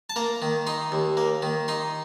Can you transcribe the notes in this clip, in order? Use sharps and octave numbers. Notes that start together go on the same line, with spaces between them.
A5
A#3 A#5
D#3
D#4 C6
D#2
A#3
D#3
D#4 C6